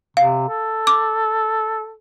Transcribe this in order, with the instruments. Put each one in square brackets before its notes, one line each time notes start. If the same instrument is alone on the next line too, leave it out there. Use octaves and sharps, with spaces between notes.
[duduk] C3 [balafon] F5
[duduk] A4
[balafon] D6